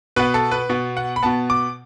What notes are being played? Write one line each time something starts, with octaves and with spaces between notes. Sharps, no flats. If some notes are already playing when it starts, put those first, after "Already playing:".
B2 B3 B4
A4
B4
B2 B3
F#5
B5
B2 B3 A5
D6